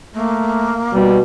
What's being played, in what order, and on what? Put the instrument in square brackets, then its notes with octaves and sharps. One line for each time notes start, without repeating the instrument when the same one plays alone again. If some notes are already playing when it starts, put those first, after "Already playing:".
[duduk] A3 [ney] A#3
[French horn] B2 [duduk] G3